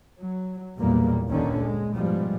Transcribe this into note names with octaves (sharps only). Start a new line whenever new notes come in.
F#3
B1 E2 A#2 G3 A#3
G1 D2 A#2 D3 D#3 C#4
G#3
G#2 B2 F3 G3 G#3